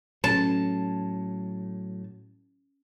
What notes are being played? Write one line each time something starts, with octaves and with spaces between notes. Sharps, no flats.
A2 F#3 C#4 A4 A5